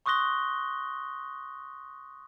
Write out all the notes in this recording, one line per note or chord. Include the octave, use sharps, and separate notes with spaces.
C6 C#6 D#6 F#6 A#6 G7